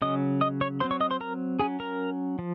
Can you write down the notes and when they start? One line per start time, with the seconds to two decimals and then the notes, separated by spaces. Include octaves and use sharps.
0.02 C#3 F#3 C#4 D#5 D#6
0.41 D#5 D#6
0.61 C#5 C#6
0.80 F#3 C4 C5 C6
0.91 C#5 C#6
1.01 D#5 D#6
1.11 C5 C6
1.21 A#4 A#5
1.59 F#3 C#4 G#4 G#5
1.80 A#4 A#5
2.39 F3